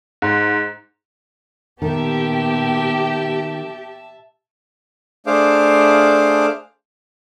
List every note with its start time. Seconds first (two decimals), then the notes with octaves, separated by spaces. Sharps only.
0.22 G#2
1.82 A#2 D#3 B3 G4 E5 A5
5.26 A3 D4 G#4 C5 F5 D6